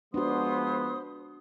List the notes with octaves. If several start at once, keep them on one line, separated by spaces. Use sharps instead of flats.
F3 G#3 B3 D4 F#4 C5 C6 D#6